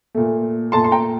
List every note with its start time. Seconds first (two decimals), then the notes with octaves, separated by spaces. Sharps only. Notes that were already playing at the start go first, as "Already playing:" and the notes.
0.15 A#2 A3
0.72 A#2 A3 A5 C6
0.84 C6
0.91 G5 A#5